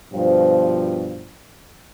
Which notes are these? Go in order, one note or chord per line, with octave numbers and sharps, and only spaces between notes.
G2 B2 F3